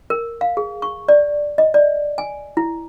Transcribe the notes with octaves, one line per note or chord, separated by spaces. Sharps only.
A#4
F5
G#4
C#6
D5
D#5
D5
G#5
E4